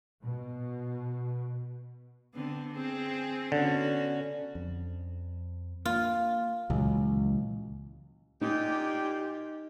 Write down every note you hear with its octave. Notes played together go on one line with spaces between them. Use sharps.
B2
D3 B3 C4
C4 G#4
D3 B3 C#4 F#4
F2
A#3 F4
C#2 A#2 E3 F#3
A#2 D#4 G4